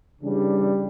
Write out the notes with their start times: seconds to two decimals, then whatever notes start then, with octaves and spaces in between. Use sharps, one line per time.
0.22 C#3 E3 G3 D4